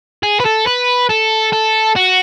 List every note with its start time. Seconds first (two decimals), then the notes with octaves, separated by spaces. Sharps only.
0.23 G#4
0.40 B4
0.45 A4
0.66 B4
1.09 A4
1.52 A4
1.96 F#4